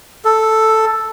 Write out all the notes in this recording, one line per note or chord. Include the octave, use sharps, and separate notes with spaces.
A4